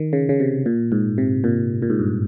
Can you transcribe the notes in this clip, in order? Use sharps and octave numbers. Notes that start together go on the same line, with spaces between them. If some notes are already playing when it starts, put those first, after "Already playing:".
Already playing: D#3
C#3
C#3
C3
A#2
G#2
C3
A#2
A#2
G#2
G2